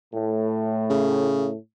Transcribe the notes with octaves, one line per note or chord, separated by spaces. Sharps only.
A2
C#3